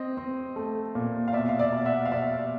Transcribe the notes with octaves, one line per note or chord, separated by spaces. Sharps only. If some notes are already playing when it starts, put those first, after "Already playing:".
Already playing: C4 D#5
C4
A3
A#2
F5
B2 D5 E5
F5
D5 E5
B2
E5 F#5
F5
B2 D5 E5